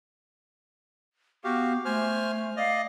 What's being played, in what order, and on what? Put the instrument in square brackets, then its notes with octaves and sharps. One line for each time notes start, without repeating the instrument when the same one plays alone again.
[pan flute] B3 [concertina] F#4 G4 F5
[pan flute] A3 [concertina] C5 G#5 F6
[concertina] D5 D#5 [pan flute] F5